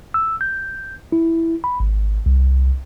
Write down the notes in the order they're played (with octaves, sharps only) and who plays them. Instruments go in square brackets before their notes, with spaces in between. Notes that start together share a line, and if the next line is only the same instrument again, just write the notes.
[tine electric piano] E6
G6
E4
B5
G#1
C2